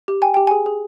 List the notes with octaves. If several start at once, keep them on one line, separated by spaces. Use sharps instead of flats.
G4
G5 G#5
G4 G5
G#4 G#5
G#4